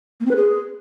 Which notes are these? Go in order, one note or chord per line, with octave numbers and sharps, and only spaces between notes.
A#3
C4
B4
G#4